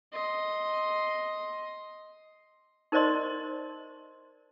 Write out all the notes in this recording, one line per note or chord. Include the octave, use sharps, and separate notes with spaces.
D#5 C6
D#4 A#4 C5 D5 D#5 C6